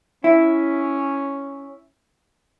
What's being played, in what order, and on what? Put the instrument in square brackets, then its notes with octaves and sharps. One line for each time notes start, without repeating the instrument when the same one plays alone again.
[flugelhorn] C#4 [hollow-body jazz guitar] E4